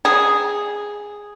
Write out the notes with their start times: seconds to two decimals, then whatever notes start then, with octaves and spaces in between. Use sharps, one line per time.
0.05 G#4